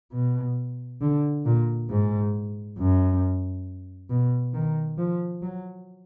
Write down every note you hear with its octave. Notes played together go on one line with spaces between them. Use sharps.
B2
D3
A#2
G#2
F#2
B2
D#3
F3
F#3